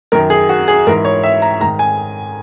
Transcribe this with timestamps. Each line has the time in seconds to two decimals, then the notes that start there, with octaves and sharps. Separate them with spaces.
0.12 F#2 D#3 A#4
0.30 G#4
0.49 F#4
0.68 G#4
0.87 G#2 E3 A#4
1.05 C#5
1.23 E5
1.42 A#5
1.61 G#2 D#3 A#5
1.79 G#5